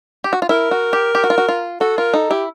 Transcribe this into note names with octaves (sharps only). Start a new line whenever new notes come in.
G4
F#4
F4
E4 A#4
F#4
G4
G4
F#4
F4
F#4
F4
F#4 A4
F4 A#4
D#4 A4
E4 G4